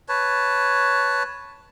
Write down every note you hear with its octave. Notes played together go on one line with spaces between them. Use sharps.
B4 C#5 A5